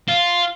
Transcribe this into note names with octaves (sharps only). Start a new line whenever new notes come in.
F4